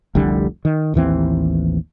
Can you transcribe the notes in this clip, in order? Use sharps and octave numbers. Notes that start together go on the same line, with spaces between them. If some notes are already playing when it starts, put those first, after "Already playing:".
F1 C2 D3 G3
D#3
A1 D#2 E3 C4